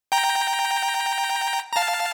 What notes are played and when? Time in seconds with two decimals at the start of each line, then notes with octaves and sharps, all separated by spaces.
0.12 G5 A#5
1.73 A#5
1.76 F5 A5